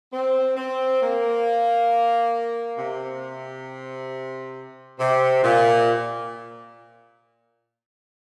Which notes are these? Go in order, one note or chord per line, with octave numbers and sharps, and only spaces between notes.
C4
C4
A#3
C3
C3
A#2